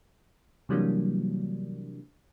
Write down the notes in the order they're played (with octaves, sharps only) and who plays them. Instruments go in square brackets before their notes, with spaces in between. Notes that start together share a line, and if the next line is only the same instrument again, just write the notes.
[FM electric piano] C3 E3 F#3 G3 A#3 D4